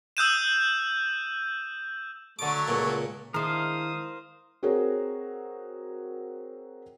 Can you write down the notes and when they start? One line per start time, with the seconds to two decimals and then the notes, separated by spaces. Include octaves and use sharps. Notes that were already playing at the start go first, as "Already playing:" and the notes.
0.17 D#6 E6 F#6 G6 D#7 E7
2.39 D3 F#3 A3 D6
2.68 C#2 A#2
3.34 D#3 G#3 D4 E4 A#4 C5 F5 D#6
4.63 C4 F#4 G#4 A#4 C#5